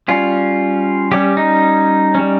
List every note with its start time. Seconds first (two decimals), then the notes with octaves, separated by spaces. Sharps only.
0.08 G3 C#4 F4
1.12 G3 C#4 G4
1.37 D#4
2.15 G3 C#4